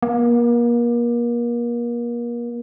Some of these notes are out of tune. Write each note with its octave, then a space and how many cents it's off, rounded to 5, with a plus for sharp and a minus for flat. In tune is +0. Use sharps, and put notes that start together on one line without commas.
A#3 +35